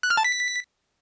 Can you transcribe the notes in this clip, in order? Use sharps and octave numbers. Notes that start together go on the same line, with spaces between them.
F#6
F6
A5
B6